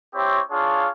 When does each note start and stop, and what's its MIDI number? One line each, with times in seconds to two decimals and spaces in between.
0.15 0.40 60
0.15 0.40 64
0.15 0.40 67
0.15 0.40 73
0.51 0.89 62
0.51 0.89 65
0.51 0.89 68
0.51 0.89 73
0.51 0.89 77